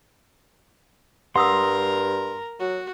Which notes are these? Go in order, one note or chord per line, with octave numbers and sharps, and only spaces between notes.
G2 A#4 F#5 A#5 C6 D#6 E6
F#3 F#4